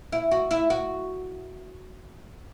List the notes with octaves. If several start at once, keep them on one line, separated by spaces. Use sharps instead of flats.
E4
F#4
E4
F#4